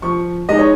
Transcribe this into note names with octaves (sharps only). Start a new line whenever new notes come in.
F3 C#6
G#3 D#4 D#5
C#5